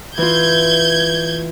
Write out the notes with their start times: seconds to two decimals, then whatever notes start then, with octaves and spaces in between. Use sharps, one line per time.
0.18 E3 F4 G6 G#6